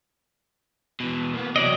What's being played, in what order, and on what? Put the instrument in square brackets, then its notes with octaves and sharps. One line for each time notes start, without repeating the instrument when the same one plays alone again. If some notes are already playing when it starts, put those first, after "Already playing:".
[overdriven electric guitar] B2 E3
A#3 B3
[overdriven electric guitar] C3 E3 [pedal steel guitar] F#3 D5 D#5